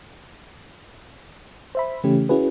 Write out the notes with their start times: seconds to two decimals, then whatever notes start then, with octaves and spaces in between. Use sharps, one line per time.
1.75 C5 E5 B5
2.04 C#3 E3 A3 C#4 G4
2.29 C#4 E4 F#4 G#4 B4